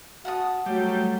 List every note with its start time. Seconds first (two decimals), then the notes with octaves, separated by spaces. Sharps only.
0.25 F#4 F#5 A5 D#6
0.66 F#3 G3 A3